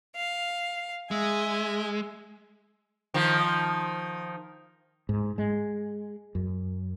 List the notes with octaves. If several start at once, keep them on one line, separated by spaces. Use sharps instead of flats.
F5
G#3 E5 G#5
D#3 F3
G#2
G#3
F#2